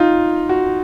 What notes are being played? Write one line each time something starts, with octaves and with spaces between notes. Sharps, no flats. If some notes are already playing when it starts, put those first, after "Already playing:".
Already playing: D#4 F4
F#4